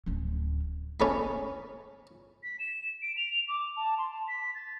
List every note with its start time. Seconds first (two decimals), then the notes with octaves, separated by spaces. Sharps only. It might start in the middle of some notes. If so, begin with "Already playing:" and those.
0.06 D1 C#4
1.00 C#4 A4 B5
2.43 B6
2.59 E7
3.02 D7
3.17 F7
3.48 D6
3.77 A5
3.98 C6
4.11 A5
4.28 B6
4.55 A6